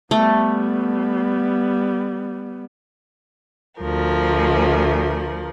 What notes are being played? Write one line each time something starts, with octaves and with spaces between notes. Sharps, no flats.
G3 A3 B3
D2 F3 A#4